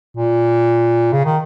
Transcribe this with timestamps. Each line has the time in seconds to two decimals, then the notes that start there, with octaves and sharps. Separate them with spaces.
0.17 A#2
1.13 C#3
1.25 D#3